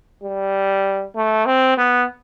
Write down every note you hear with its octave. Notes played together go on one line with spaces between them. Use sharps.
G3
A3
C4
B3